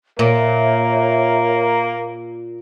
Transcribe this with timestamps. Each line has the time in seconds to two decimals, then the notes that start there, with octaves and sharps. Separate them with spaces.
0.19 A#2 A#3 A#4 C#5 E5